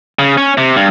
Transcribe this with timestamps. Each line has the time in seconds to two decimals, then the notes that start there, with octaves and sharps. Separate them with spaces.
0.19 C#3
0.38 C#4
0.58 C3
0.76 G2